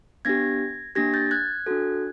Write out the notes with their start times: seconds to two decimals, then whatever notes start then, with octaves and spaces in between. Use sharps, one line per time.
0.25 B3 D4 G4 G#6 A#6
0.95 A#3 D4 G4 G#6 A#6
1.14 G6 A6
1.31 F#6 G#6
1.66 D4 F#4 A4